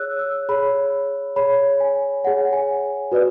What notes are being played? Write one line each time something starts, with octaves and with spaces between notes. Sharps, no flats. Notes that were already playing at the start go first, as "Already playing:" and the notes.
Already playing: G#4 C#5 E6 F#6
E6
G#4 C#5 B5
G#4 C#5 B5
G#5
G#4 C#5 F#5
G#5
F#4 B4 D5